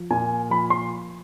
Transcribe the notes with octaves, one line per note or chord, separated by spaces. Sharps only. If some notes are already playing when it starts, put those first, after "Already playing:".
Already playing: F3
A#2 G#5
F3 B5
C6